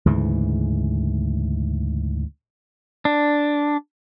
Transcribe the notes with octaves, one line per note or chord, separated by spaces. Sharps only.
D2 G#2 C#3 E3
D4